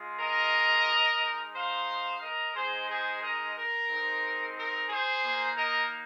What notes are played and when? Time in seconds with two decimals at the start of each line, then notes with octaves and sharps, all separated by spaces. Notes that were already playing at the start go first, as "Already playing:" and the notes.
Already playing: G#3 F4
0.20 A#4 D#5
1.21 G#3 D#4
1.54 C5 F5
2.21 A#4 D#5
2.55 G#3 D#4 G#4 C5
2.89 G#4 C5
3.22 A#4 D#5
3.55 A#4
3.89 G#3 C4 D#4
4.56 A#4
4.90 G#4 C5
5.23 A#3 D#4
5.56 A#4 D#5